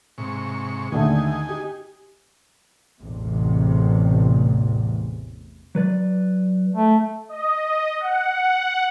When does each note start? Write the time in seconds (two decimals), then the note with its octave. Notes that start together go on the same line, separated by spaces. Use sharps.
0.18 G#2 C3 C#6
0.92 D#2 D3 A3 D#4 G#5
1.49 G4
3.02 A1 E2 C3
5.75 F#3 B4 D5
6.74 A3
7.29 D#5
8.00 F#5